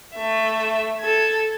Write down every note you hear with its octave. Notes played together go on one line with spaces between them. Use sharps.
A3 E5
A4 G#6